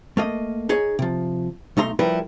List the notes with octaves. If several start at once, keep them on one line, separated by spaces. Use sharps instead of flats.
A3 A#3 D#5
D#4 G#4 C#5
C3 F3
B1 A3 D#4 A#5 C6
F3 G3 E4 A#4 B4